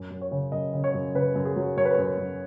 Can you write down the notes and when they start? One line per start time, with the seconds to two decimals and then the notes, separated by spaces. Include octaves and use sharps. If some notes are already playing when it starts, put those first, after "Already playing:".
Already playing: F#2
0.11 F#2
0.21 C#5
0.31 C#3
0.52 F#2 D#5
0.74 C#3
0.84 C#5
0.94 F#2
1.15 C#3 B4
1.36 F#2
1.45 G#4
1.56 F#3
1.77 F#2 C#5
1.85 B4
1.94 F#2 C#5
2.18 F#2